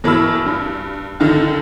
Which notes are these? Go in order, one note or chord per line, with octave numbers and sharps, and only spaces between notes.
B2 E3 A#4 B5 E6
G2
C#2 D3 D#3